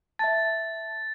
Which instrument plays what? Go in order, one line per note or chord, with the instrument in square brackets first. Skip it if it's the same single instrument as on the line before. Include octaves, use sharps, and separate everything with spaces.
[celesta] E5 A5 [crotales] A6